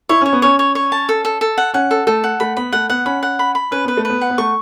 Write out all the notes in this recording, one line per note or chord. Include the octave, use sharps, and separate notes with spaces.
E4 C#5
C#4 C#5
B3
C#4 C#5
C#5
C#5
A5
A4
A4
A4
F#5
C#4 F#5
A4
A3 A4
F#5
A3 B5
B3 B5
A3 F#5
B3 F#5
C#4 B5
F#5
B5
B5
C#4 B4
B3 B4
A3
B3 B4
F#5
B3
A3 C#6